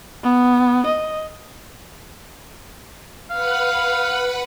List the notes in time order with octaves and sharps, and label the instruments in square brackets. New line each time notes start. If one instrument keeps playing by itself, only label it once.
[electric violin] B3
D#5
[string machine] B4 F#5 B5 [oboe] F5